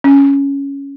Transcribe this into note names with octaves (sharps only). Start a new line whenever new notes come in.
C#4